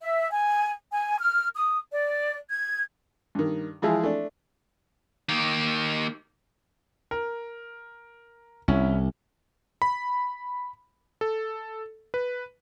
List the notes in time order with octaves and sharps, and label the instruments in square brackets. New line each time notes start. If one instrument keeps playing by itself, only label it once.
[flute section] E5
G#5
G#5
F6
D#6
D5
G#6
[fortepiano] G2 D#3
E3 F3 G#3 E4 G#4
A3 D4
[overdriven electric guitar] D#3 A#3
[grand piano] A#4
[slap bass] C2 [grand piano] C#4 E4
[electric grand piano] B5
A4
B4